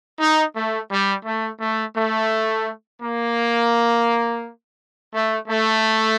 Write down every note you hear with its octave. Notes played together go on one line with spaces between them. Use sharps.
D#4
A3
G3
A3
A3
A3
A#3
A3
A3